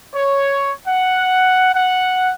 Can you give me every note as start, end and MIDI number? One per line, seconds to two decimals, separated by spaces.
0.14 0.72 73
0.87 1.71 78
1.74 2.34 78